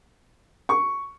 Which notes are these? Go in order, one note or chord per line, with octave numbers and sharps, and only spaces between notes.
C#6